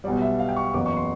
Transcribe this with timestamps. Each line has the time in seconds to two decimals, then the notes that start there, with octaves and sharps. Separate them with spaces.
0.04 B1 B2 G3 D5
0.22 E5
0.39 F5
0.48 G5
0.56 C#6
0.74 F#1 E2 C#3 F#3 B3 D6
0.86 C#6
0.97 C6